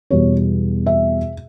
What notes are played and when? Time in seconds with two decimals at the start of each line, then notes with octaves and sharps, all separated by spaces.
0.11 E2 B2 G3 C#5
0.86 E5